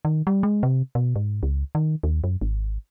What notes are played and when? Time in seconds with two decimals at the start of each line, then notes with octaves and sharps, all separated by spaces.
0.05 D#3
0.27 G3
0.43 G#3
0.63 C3
0.95 B2
1.16 G#2
1.43 C#2
1.75 D#3
2.03 D#2
2.24 F#2
2.41 G#1